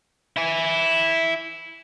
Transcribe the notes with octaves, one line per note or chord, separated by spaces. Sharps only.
E4 G#5